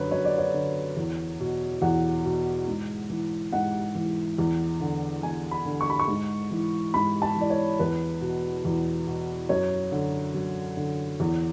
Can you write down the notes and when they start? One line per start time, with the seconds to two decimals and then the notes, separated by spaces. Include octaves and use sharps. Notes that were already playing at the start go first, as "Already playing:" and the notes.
Already playing: F#2 D3 B4 C#5
0.11 F#2 C#5
0.25 D5
0.38 C#5
0.54 D3
0.97 E2
1.40 B2
1.82 E2 F#5
2.25 B2
2.68 G#2
3.10 E3
3.53 G#2 F#5
3.95 E3
4.38 E2
4.81 D3
5.23 E2 G#5
5.51 B5
5.66 D3
5.81 C#6
5.90 B5
6.00 C#6
6.08 G#2
6.51 E3
6.94 G#2 B5
7.22 A5
7.36 E3 D5
7.50 C#5
7.79 E2 B4
8.21 B2
8.65 E2
9.07 B2
9.49 F#2 C#5
9.92 D3
10.35 F#2
10.77 D3
11.20 E2